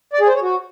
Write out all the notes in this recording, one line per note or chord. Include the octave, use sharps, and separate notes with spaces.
D5
G#4
C5
C#5
F#4